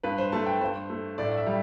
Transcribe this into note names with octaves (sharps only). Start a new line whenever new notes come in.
G2 B4
C5
A3 A5
G5
G2 C5
A3
A2 D5
E5
G3